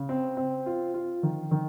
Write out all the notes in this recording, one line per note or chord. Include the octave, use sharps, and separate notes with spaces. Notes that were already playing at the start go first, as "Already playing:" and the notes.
Already playing: C#3
C4
C4
F4
F4
D#3
D#3